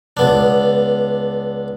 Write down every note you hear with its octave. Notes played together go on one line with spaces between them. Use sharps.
C#2 B3 D4